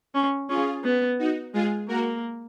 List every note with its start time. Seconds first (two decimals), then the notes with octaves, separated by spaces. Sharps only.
0.15 C#4
0.49 C#4 F4 G#4
0.84 B3
1.19 D#4 F#4
1.54 G#3 F4 G#4
1.88 A#3 F#4 A#4